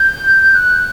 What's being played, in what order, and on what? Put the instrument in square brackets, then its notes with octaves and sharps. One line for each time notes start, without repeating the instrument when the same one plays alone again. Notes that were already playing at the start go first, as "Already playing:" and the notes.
Already playing: [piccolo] G6
F#6